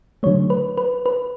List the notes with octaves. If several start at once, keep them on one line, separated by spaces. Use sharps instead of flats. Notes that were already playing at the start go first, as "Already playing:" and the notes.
D3 F#3 A3 C#5
B4
B4
B4